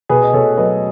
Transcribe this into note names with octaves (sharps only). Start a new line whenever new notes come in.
B2 G#4 B4
D#5
B2 A4 C#5
F#3 B4 D#5